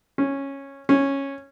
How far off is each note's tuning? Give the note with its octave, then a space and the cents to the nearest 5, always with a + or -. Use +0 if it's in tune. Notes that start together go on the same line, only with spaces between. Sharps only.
C#4 -10
C#4 -10